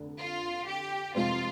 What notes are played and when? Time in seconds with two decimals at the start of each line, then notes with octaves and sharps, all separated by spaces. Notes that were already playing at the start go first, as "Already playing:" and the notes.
Already playing: F1 D3
0.20 F4
0.67 G4
1.15 F2 C3 F3 G#3 C4 F4